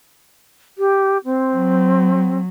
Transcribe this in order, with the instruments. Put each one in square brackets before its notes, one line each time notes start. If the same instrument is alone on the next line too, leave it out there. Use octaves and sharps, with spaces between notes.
[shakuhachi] G4
C4
[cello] F#3